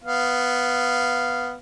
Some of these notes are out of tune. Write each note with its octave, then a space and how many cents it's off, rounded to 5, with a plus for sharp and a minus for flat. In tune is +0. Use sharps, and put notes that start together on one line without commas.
B3 +0 F5 -10